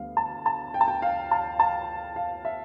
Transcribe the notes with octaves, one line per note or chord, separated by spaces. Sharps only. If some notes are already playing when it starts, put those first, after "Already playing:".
Already playing: D2 D3 G3 B3 F5
A5
A5
G5
A5
G5
F5
A5
A5
F5
E5